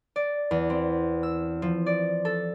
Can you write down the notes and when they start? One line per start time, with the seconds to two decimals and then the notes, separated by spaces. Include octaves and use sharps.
0.16 D5
0.51 E2
0.70 C4
1.23 E6
1.62 F3
1.86 D5
2.25 A4